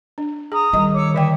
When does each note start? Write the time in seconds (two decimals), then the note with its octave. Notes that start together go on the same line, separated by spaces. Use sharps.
0.18 D4
0.52 G#4 A#5 D#6
0.73 D#3 G3 D#5
0.94 C#5 D6 E6
1.14 D3 D5 E5 G5